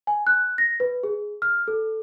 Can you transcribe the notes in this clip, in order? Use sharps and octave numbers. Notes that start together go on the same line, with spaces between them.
G#5
F#6
A#6
B4
G#4
F6
A4